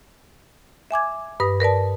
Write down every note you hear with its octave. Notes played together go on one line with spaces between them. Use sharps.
E5 G#5 D6 G#6
G2 B4 D#6
A#4 B4 D5 A5